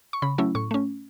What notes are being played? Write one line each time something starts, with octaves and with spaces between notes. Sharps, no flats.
C#6
C#3 B5
F#3 A3 C#4 E4
A2 C#6
A3 C#4